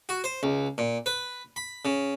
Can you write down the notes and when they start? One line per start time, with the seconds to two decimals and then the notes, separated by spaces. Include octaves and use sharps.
0.09 F#4
0.24 C5
0.43 C#2
0.78 A#2
1.06 B4
1.56 B5
1.85 C#3